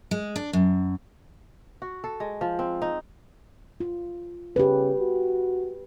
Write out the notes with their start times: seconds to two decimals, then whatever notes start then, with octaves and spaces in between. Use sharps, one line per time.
0.11 G#3
0.36 D4
0.53 F#2
1.82 F#4
2.04 A4
2.20 G#3
2.41 F3
2.59 C4
2.82 D#4
3.80 F4
4.56 C#3 G4 B4
4.99 F#4